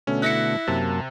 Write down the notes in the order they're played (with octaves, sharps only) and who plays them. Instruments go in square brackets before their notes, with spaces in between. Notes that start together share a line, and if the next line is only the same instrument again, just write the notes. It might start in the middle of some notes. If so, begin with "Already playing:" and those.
[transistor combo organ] B2 D3 A3 [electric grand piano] C#4
[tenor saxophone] E4 [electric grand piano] F#6 A#6 C#7
[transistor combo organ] F#2 A#3 A5 [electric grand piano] C3